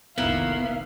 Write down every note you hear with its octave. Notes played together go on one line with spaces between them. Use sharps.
F1 B1 D#3 A#3 B3 E4 E5 F5